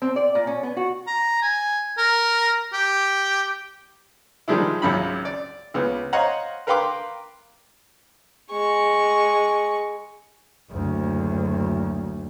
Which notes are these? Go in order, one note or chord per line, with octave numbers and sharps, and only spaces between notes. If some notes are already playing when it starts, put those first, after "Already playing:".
C4
D5
A#2
C#4
B3
F#4
A#5
G#5
A#4
G4
D#3 F3 G3 G#3 D4 E4
G#1 C#2 F#2 B5
D5
C#2 B3
C5 C#5 D#5 F5 F#5 A#5
A#4 B4 F5 G5 C6 D6
G#3 C#6
F#1 D2